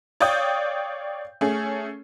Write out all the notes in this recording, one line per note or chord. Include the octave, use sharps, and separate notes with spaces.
C#5 D5 F5 G5 D#6 G6
A3 C#4 G#4